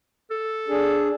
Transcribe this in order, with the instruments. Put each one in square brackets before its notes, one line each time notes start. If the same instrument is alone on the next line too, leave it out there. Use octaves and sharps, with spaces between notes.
[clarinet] A4
[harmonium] D4 G#4